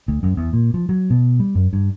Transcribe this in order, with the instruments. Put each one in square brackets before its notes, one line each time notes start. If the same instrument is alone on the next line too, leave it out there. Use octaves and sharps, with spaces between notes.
[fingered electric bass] D2
F#2
E2
A#2
F3
F#3
B2
G3
F#2
G2